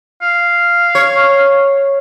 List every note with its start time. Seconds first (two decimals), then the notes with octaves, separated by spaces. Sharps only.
0.22 F5
0.95 C#5